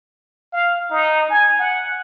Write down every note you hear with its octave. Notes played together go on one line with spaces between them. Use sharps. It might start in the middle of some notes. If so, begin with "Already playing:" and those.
F5
D#4
G#5
F#5